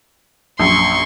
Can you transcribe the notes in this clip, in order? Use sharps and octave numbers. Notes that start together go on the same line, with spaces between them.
A#1 F#2 C6 C#6